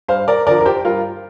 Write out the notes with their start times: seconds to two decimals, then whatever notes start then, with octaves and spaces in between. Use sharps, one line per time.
0.08 G2 C5 F5
0.28 A#4 D5
0.47 D3 F3 A#4 D5
0.61 A#4
0.65 G4 C5
0.85 G2 F4 A#4